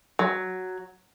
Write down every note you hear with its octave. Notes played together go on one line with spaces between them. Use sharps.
F#3